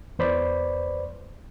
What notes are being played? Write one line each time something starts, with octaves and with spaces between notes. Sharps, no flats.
E2 B4 C5 D5 B5